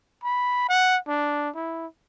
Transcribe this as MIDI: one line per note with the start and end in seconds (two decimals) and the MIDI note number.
0.23 0.68 83
0.69 0.97 78
1.08 1.49 62
1.55 1.86 64